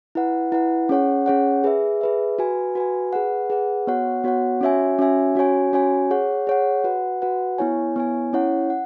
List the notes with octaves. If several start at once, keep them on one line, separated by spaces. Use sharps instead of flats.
E4 B4 F#5
E4 B4 F#5
C#4 G#4 C#5 F#5
C#4 G#4 C#5 F#5
G#4 B4 E5
G#4 B4 E5
F#4 B4 G#5
F#4 B4 G#5
G#4 B4 F#5
G#4 B4 F#5
B3 F#4 C#5 F#5
B3 F#4 C#5 F#5
C#4 F#4 C#5 E5 G#5
C#4 F#4 C#5 E5 G#5
C#4 F#4 C#5 G#5
C#4 F#4 C#5 G#5
G#4 C#5 F#5
G#4 C#5 F#5
F#4 B4 F#5
F#4 B4 F#5
B3 E4 C#5 G#5
B3 E4 C#5 G#5
C#4 E4 C#5 F#5
F#5